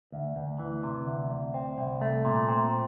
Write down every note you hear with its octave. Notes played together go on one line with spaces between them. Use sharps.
D2
D2
E3
C3
D2
D2
C4
C2
A3
A#2
C4